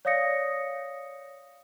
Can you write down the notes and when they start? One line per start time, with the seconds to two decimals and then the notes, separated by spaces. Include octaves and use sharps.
0.05 C#5 D5 F5 D#6 A#6 C#7